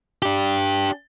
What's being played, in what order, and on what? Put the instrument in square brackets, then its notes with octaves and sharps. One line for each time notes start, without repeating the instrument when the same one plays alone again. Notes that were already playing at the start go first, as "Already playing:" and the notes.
[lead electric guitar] D4 G4